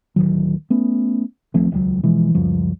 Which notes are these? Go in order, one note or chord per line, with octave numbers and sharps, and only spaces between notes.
D1 E2 D#3 F#3
A3 B3 C#4
D#1 F3 A3 C4
D#1 C#2 F#3
B2 E3 F3 G#3
C#2 F#2 F3 G3